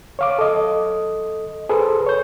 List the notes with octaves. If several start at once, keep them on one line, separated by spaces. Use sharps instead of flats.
C#5 F5 D6
A4 D#5
G#4 A4 B4 C5
C#5 G6